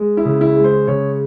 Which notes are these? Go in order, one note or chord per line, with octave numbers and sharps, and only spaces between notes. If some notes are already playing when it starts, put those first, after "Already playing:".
Already playing: G#3
E4
C#3
E4
G#3
C5
C#3 C#5